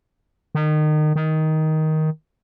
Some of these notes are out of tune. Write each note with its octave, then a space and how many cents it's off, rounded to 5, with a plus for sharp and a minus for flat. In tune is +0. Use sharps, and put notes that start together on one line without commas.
D#3 -30
D#3 +10